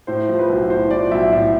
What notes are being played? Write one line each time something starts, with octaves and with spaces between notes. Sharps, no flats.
A2 C5
F3
B4
B1
A2 C5
F3 D5
B1 E5
A2 E5